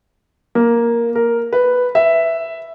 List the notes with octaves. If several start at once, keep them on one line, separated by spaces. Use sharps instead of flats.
A#3
A#4
B4
E5